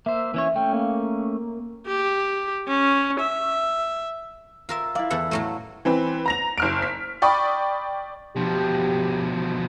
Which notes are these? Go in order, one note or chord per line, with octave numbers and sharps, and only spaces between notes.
A#3 C5 E5
E3 C#4 C#5
A3 C#4 G5
A#3
G4
C#4
E5
F4 A#4 E5
E4 D5 F5
E2 A4 F#5
A2 F#3 A3
E3 C4 B4
A#5 A#6 F7
F#1 F6 D7
B6
D5 G5 B5 C#6 D#6
B2 F3 G4